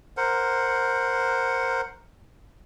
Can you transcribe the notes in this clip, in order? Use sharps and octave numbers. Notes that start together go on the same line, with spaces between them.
A#4 C5 F#5